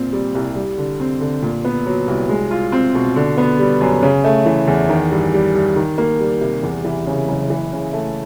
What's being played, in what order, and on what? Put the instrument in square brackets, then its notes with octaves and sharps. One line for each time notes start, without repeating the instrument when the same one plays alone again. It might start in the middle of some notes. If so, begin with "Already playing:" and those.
Already playing: [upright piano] A#2 C4
G3
C2
G3
D3
C4
D3
A#2
B3
F#3
C2
G#3
F4
C4
B2
D3
B3
G3
F#2
C#3
A3
E3
E2
D#3
G2
G3
G2
D#3
A#3
G3
C3
E2
E3
C#3
F#1
E3
C#3
A3